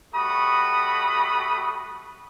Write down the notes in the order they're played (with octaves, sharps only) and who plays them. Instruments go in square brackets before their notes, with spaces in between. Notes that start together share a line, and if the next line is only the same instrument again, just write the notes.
[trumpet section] G3 A3 F#4 B5 D#6